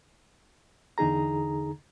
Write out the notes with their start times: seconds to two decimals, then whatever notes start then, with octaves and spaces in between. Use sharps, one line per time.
0.98 E2 D3 D#4 G#4 A#5